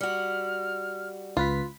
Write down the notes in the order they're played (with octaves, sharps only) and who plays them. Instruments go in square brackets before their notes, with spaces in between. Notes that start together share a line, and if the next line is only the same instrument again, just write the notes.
[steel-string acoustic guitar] G3 F#4 [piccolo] F6
[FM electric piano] C#2 B4 B6 [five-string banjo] F4